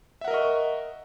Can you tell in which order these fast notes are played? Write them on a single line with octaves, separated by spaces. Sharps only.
E5 F#5 A#4 D#5 C#6